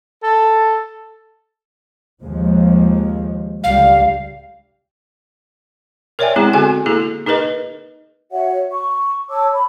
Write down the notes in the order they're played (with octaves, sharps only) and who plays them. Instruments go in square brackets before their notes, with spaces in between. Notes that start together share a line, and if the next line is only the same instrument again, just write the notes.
[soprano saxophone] A4
[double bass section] D#2 F3 G#3
[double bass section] C#2 D3 G3 [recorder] F5
[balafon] A#4 C#5 D5 E5 G5 G#5
G#3 B3 C4 E4 G#4
D3 C4 F#4 G#4 G#5
A#3 E4 G#4 A4
D#4 G#4 A#4 B4 D#5
[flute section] F#4 C#5 E5 F#5
C#6
C#5 A5 D6 E6
B5